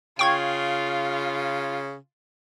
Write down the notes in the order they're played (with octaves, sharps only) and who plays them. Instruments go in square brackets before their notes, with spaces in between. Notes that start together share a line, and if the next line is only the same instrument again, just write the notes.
[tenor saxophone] C#3 [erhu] F4 [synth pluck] G5 C#6 G#6